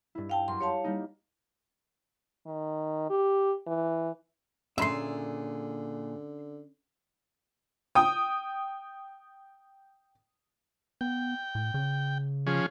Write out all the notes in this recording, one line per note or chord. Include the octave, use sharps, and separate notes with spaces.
G2 E4
F5 G5 A5
F#2 C6
G4 C#5 F5 A5
G3 A#3 D#4
D#3
G4
E3
A#2 D3 C#4 G#4 E5 B5 C6
G5 D#6
B3 G5
A2
C#3
F3 C#4 G#4